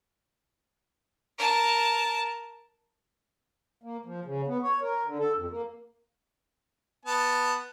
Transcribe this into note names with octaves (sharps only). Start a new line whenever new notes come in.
A#4 A5
A#3
F3
C#3
B3
C#5
A#4
D3
A4
F2
A#3
B3 A5